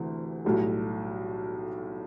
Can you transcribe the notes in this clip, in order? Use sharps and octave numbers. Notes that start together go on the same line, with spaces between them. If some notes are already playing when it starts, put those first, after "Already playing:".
Already playing: D2 C3 E3 A3
B1 A2 G3